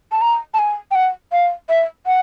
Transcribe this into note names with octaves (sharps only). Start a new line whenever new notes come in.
A5
A#5
A5
G#5
G5
F#5
F5
E5
F#5